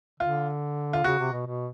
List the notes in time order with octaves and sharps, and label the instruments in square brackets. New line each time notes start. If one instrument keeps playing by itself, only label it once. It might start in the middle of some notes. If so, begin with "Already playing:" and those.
[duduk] D3 [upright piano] F4
[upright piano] F4
[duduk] C#3 [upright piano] F#4
[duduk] C3
B2
B2